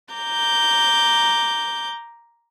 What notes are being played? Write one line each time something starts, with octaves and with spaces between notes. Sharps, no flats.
A#5 D6 G6